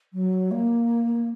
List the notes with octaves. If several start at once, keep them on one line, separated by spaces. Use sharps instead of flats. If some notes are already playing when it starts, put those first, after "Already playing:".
F#3
A#3